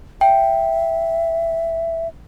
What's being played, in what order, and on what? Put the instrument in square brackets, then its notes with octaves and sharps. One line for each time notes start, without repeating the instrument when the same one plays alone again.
[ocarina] E5 [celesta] G5